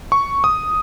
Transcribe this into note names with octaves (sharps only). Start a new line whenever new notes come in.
C#6
D#6